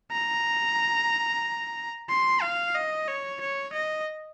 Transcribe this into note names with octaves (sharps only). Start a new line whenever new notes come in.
A#5
C6
F5
D#5
C#5
C#5
D#5